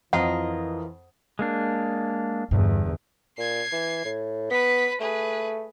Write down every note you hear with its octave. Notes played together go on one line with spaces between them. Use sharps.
F2 E3 F4 A#4 D#5 F#5
G#3 A#3 D4
G1 E2 G2
A#2 G#6 C7
E3
A2
B3 B4 B6
A3 G#4 B4